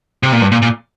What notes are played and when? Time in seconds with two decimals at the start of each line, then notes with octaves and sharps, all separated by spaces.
0.23 C3
0.32 A#2
0.42 G2
0.52 A#2
0.62 A#2